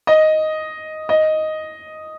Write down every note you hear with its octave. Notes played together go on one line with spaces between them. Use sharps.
D#5
D#5